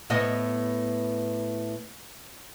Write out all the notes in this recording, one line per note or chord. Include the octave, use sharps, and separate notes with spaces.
A2 B3 D#5